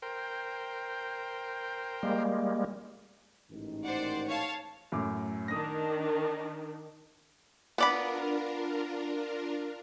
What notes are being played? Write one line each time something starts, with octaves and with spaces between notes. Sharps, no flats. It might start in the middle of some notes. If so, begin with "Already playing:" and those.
A#4 C5 G5
G3 G#3 A#3
A1 G#2 D#3
C5 D5 F#5
C#5 F5 A5
F#2 A2 D6
D#3 D4 D#6 A#6
B3 D4 F4 A#4 D5 B5